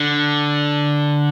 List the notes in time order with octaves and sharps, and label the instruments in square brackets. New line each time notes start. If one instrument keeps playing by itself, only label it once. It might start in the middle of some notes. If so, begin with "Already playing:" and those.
Already playing: [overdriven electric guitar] D3